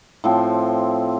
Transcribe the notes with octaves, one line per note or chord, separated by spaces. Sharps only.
A2 F3 C4